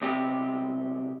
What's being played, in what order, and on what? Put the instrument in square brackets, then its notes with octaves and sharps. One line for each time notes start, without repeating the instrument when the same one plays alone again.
[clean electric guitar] B1 C3 G4